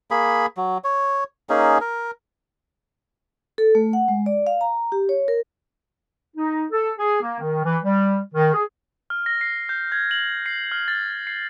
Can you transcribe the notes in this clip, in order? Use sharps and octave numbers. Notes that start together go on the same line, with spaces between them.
A#3 G#4 B5
F#3
C#5
A#3 C#4 D#4 G#4
A#4
A4
A3
F#5
G#3
D5
F5
A#5
G4
C#5
A#4
D#4
A4
G#4
A#3
D#3
E3
G3
D#3
G#4
F6
A#6
C7
G6
G#6
F#7
C7
F6
A6
C7